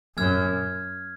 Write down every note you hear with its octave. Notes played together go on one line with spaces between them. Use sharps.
F#2 F6 G#6